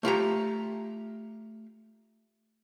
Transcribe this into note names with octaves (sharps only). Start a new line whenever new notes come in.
A3 F4 G4 A#5